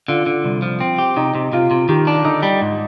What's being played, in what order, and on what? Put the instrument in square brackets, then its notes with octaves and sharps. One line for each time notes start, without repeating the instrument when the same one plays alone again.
[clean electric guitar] D3 [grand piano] F4
[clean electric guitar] D3
C2
F3
C4
G4
[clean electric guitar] C3 [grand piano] D#4
[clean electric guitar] C3
[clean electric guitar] C3 [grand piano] F4
[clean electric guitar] C3
[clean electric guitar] D#3 [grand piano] G4
[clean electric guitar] D4
[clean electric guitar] D3 [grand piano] D#4
[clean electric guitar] G3
G#2